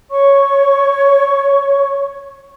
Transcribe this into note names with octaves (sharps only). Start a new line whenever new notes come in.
C#5 C#6